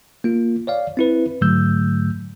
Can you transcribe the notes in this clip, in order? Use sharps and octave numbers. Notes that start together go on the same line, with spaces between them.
A#3 F4
C#5 D5 F5
C4 E4 B4
G#2 D3 F#3 A3 E6 G6